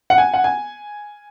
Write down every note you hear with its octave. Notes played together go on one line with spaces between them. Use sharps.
F#5
G#5
F#5
G#5